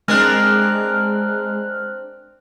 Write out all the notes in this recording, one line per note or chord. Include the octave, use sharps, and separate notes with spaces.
G#3 C4 D4 A#4 F6 F#6